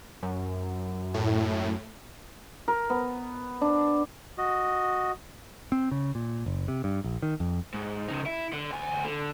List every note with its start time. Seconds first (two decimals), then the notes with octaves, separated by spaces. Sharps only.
0.23 F#2
1.14 A2
2.68 A#4
2.90 B3
3.61 D4
4.38 F#4 D#5
5.72 C4
5.91 C#3
6.15 A#2
6.46 F#1
6.68 C3
6.84 G2
7.04 A#1
7.22 D#3
7.40 F2
7.74 G#2
8.08 C#3 D#4
8.26 E4
8.53 D3
8.71 D2 G#5
9.04 D3